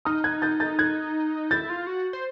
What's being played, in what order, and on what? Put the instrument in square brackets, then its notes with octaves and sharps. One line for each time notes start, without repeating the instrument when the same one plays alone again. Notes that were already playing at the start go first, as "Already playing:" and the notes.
[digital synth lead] D#4 [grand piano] D#6 F6
[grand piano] F#6 G#6
G6 A6
G6 A6
F#6 G#6
[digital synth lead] E4 [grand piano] G6 A6
[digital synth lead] F4
F#4
C5